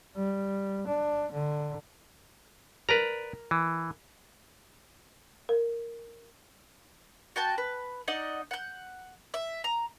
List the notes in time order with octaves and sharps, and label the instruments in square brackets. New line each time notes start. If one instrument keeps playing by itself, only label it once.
[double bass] G3
D4
D3
[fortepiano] A#4 [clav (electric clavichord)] B4 D5 A#5
[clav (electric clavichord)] E3
[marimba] A#4
[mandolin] F#4 G5 A5
B4
D#4 D5 D#5 F#5
F#5 G6
E5
A#5